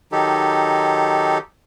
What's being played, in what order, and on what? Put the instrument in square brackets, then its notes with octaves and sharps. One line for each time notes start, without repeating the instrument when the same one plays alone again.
[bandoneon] D#3 F#3 D#4 G4 A4